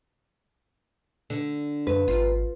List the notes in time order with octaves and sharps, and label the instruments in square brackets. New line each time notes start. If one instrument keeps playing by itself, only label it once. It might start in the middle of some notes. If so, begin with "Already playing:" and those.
[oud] D3
[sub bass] F#2 [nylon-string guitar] B4
[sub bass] G#1 [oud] F4